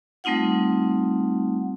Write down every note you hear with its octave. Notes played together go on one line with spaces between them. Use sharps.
G3 A3 C4 D#4 F4 F#5